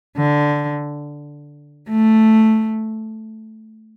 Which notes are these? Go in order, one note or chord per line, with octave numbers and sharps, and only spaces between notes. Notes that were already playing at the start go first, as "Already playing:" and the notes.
D3
A3